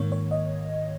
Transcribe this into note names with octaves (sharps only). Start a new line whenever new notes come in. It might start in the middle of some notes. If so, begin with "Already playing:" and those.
Already playing: G#2 D#3 A#3 C#5
C#5
D#5